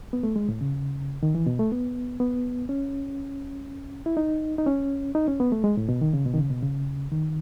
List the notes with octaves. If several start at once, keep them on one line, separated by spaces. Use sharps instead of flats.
B3
A3
G#3
A2
C#3
D#3
E3
B2
A3
B3
B3
C#4
E4
D#4
D#4
C#4
D#4
C#4
B3
A3
G#3
A2
B2
D#3
C#3
B2
D#3
C#3
B2
C#3
D#3